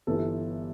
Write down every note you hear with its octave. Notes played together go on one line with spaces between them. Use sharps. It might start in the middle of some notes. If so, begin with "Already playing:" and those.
G1 G2 E3 A4